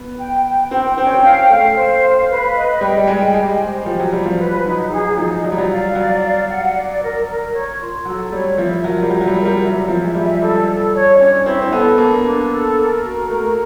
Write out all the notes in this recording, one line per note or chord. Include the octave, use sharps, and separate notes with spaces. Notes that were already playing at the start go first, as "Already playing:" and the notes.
Already playing: B3
G5
G5
C4 G5
C4 G5
C#4
C4
C#4 F5
A3 F5
C5
F5
B4
D#5
G3 G5
G3
G#3 D#5
G#3 G4
C5
F3 G4
F#3
G3 C5
F3
F#3 B4
F#3 D#4
F#3 G#4
F3 D#4
F#3 D5
G3
F#3
F5
F#3 D5
F5
F#5
D5
A#4
A#4
C#5
F4
F#3 A4
G3 C#5
F3 E5
F#3 A#4
G3
F#3 E5
F#3
G3
A#4
G3
F#3 E5
F3 E5
G#3
G3 E5
G3 A4
A4
C#5
D4
C#4 C#5
C4 E4
C4
B3 A4
A#3 D4
D4
A4
A#4
F#4
A3 A#4